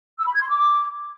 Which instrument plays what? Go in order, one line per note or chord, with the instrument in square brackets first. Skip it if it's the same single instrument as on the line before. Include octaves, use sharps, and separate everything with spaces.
[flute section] E6
B5
G#6
C6
D6